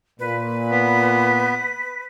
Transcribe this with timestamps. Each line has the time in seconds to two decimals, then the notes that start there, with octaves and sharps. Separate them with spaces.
0.20 A#2 B4
0.71 B3 B6